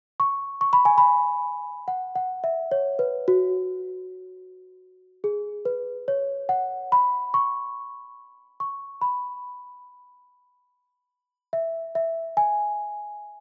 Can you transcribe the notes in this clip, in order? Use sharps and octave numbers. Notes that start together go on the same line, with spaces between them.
C#6
C#6
B5
G#5
B5
F#5
F#5
E5
C#5
B4
F#4
G#4
B4
C#5
F#5
B5
C#6
C#6
B5
E5
E5
G#5